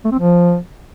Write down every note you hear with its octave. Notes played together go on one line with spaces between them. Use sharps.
A3
C4
F3